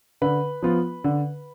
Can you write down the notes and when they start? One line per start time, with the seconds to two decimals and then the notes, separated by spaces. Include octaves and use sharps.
0.22 D3 B4
0.62 F3 B3 F4
1.04 D3